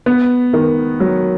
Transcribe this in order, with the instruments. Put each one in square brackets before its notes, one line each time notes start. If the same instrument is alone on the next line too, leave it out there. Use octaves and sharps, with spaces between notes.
[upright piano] B3
D#3
F#3